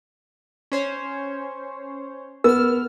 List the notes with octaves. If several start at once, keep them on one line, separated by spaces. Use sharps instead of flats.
C#4 C5 C#5
B3 A#4 E6 F6